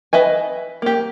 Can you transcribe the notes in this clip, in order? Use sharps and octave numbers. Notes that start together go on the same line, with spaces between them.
B4 D#5 E5 G#5
A#3 G4